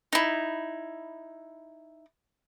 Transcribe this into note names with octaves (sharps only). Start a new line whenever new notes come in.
D#4 E4